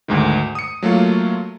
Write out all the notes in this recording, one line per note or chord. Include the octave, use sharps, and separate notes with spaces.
D2 G#2 D#3
D#6 C#7
F#3 A3 A#3 F4